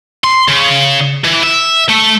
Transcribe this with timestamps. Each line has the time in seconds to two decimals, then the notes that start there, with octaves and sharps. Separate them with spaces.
0.24 C6
0.49 C#3
1.24 E3
1.43 E5
1.89 A3